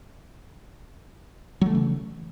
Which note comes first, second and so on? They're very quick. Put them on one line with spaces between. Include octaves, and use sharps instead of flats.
F#3 A3 E3 C#3